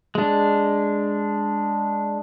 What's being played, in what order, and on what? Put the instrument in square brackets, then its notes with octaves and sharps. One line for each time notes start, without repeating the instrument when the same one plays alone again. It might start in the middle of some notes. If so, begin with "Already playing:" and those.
[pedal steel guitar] G#3 D4